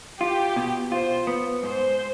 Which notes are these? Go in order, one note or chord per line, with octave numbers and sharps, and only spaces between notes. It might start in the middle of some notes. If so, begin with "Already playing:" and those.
F4 G4
B2
F4 C5
B3
G#2 C5